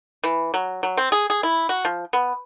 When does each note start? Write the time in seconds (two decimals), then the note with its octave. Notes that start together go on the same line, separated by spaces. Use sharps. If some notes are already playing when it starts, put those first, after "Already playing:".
0.24 E3
0.54 F#3
0.83 F#3
0.97 C4
1.12 G#4
1.30 G#4
1.43 E4
1.69 F#4
1.85 F3
2.13 B3